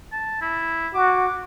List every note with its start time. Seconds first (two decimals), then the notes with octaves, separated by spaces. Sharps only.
0.12 A5
0.41 E4
0.94 F#4 D6